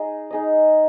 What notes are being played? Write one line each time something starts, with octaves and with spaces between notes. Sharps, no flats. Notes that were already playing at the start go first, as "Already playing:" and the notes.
Already playing: D#4 G#4 D#5
D#4 G#4 D#5